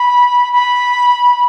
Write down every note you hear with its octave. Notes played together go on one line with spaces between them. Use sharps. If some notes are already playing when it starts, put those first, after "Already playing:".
Already playing: B5
B5